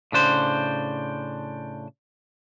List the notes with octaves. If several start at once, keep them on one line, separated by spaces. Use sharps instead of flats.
A2 C#3 D4 C5